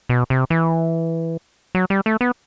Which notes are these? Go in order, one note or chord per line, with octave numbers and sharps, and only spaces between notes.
B2
C3
E3
F#3
G3
A3
B3